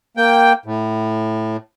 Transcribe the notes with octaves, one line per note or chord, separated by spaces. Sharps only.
A#3 G5
A2